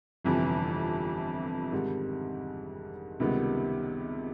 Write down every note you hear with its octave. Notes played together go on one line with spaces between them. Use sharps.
G1 F2 C3 E3
G#2 D#3 G3 C4
C#2 C3 D#3 G3 B3